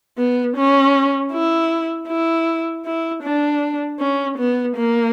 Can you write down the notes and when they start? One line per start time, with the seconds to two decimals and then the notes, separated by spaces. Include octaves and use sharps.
0.18 B3
0.56 C#4
1.32 E4
2.08 E4
2.85 E4
3.23 D4
4.00 C#4
4.38 B3
4.76 A#3